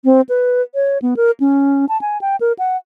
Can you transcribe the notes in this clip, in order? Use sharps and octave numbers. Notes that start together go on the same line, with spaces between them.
C4
B4
C#5
B3
A#4
C#4
A5
G#5
G5
A#4
F#5